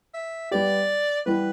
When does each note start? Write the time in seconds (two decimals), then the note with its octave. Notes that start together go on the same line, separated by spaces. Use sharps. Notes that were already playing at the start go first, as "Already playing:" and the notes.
0.14 E5
0.51 G3 B3 G4 D5
1.26 E3 G3 B3 B4